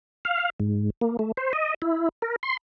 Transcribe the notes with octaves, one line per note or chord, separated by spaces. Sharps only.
F5
G#2
A#3
A3
C5
D#5
E4
A#4
C6